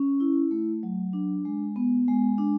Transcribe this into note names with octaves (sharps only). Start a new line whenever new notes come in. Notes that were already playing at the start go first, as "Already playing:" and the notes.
Already playing: C#4
E4
A3
F#3
D4
G#3
B3
G#3
D4